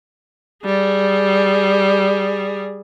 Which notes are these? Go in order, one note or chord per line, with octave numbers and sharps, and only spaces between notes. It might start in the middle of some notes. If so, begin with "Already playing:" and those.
G3 G#4